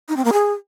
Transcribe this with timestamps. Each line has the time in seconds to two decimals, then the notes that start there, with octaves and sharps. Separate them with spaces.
0.08 D#4
0.17 C4
0.25 A#3
0.33 G#4